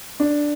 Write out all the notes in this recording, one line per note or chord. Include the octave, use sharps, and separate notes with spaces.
D4